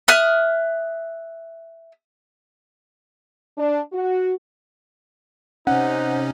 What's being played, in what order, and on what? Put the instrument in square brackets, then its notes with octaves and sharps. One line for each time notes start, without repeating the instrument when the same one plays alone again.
[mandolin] E5 D#6 F6 F#6
[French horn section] D4
F#4
[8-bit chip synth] C3 C#4 [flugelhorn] D#4 [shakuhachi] C5 [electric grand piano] F#5